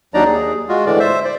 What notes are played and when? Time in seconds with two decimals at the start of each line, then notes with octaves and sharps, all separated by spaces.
0.14 D#2 F#3 D4 D#4 D5 A#5
0.26 D#2 G#4
0.69 G#3 F4 F#4
0.86 A2 D3 E3 G#3 D5
0.99 C5 E5
1.25 C5 D5